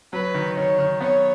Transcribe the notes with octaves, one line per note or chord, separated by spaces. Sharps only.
F#3 B4
D#3
D#3 C#5
D#3
B3 C#5